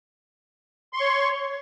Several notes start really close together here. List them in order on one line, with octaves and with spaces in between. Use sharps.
C6 C#6 C#5